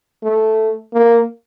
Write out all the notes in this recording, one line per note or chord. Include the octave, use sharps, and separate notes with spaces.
A3
A#3